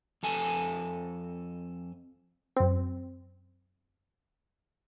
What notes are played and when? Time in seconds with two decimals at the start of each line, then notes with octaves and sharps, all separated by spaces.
0.23 F2 A4 G#5
2.57 F#2 C4